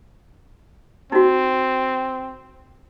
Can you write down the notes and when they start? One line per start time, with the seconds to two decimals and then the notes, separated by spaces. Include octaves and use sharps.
1.12 C4 D#4 F#4